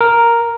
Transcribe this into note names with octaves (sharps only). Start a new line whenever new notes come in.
A#4